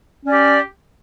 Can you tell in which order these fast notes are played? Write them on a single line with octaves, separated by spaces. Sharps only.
C#4 D5 G4